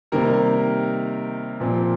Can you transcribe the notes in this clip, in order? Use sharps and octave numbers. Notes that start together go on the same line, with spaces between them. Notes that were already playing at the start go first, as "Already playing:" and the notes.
C3 D#3 G3 A#3 A#4
A#2 F3 C4